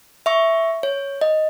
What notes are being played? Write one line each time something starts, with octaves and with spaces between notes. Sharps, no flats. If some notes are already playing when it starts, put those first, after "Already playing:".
E5 C#6
C#5
D#5